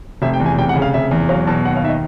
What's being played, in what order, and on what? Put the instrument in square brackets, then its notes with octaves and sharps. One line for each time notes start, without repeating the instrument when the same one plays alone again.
[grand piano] F1 E5
G5
E2
G#5
F1 G5
F#5
C#3
F5
F1 E5
E2
F#3 F5
B2 A5
D#2 F#5
F5
D#3 E5
D#5